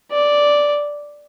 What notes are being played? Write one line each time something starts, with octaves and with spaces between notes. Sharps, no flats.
D5